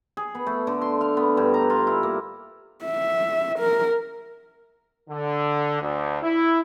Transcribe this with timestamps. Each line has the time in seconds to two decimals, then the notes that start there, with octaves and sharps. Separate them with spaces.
0.17 G#4
0.35 B3
0.46 A3
0.67 D3
0.81 C6
1.01 F5
1.17 B3
1.37 G2
1.54 A#5
1.70 F4
1.87 E4
2.03 A#3
2.85 E5
3.59 A#4
5.10 D3
5.81 D2
6.22 E4